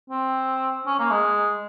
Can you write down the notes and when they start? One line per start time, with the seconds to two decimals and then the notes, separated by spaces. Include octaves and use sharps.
0.10 C4
0.86 C#4
0.99 A#3
1.11 G#3